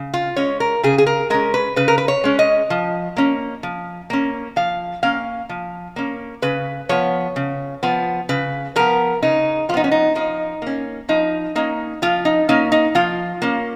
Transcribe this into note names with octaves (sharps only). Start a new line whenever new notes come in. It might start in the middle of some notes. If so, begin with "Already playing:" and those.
Already playing: C#3
F4
G#3 C#4 C#5
A#4
C#3 G#4
G#4
A#4
G#3 C#4 A#4
B4
C#3 B4
A#4
B4
C#5
G#3 C#4
D#5
F3
A#3 C#4
F3
A#3 C#4
F3 F5
A#3 C#4 F5
F3
A#3 C#4
C#3 B4
F3 B3 C#5
C#3
F3 B3
C#3 B4
F3 B3 A#4
C#3 D#4
F3 B3 D#4 F4
C#4
D#4
F3 D#4
A#3 C#4
F3 D#4
A#3 C#4 D#4
F3 F4
D#4
A#3 C#4 D#4
D#4
F3 F4
A#3 C#4